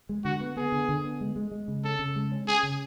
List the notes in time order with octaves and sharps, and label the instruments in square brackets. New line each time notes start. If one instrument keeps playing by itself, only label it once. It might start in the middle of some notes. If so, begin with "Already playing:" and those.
[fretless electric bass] G#3
[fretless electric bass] D3 [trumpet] F#4
[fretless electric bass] B3
[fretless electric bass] B3 [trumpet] G#4
[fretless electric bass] D3
D3
B3
G#3
G#3
G#3
C#3
[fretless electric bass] C#4 [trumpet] A4
[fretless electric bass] C#3
G#3
C#4
[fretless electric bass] C#4 [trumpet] G#4
[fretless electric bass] C#3